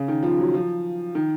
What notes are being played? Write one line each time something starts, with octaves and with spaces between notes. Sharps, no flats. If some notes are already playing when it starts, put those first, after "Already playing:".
Already playing: C#3
D#3
F3
F#3
F3
D#3